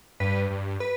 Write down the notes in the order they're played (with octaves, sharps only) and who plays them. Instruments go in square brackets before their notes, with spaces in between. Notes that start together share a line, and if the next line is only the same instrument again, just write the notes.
[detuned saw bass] G2 [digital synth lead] B4
[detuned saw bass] G2
[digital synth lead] B4